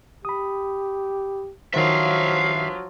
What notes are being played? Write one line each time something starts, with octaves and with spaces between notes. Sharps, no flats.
G4 B5 D#6
G2 D#3 F3 F#3 C5 E5 F5